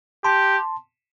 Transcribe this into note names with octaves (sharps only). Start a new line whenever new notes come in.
G4 A5 C6